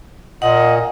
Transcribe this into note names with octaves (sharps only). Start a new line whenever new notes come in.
A#2 D#5 F#5